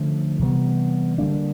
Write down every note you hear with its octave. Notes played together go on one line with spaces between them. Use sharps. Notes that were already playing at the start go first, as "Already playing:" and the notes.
Already playing: D3 F3 A3 C#4
C3 E3 G3 B3
D3 G3 A#3 D4